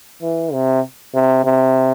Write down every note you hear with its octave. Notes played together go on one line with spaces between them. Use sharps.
E3
C3
C3
C3